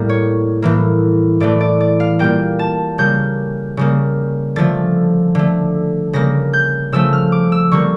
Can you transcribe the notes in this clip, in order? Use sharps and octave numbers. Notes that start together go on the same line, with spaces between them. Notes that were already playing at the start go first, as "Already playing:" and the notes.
Already playing: A2 G3 A#3
C#5
A2 E3 A#3
A2 E3 A3 D5
D5
D5
F5
A#2 G3 A#3 G5
A5
C#3 G3 A#3 G6
C#3 G3 A#3
D3 F3 A3 A6
D3 A3
C#3 G3 A#3 A#6
G6
C#3 F3 A3 E6
F6
D6
E6
D3 G3 A#3 C#6